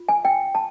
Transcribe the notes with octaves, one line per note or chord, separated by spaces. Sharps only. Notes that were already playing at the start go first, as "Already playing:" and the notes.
Already playing: F4
G#5
G5
A5